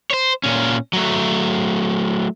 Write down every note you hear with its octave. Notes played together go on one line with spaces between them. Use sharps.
C5 C#5
A#2 C#4
F#3 A3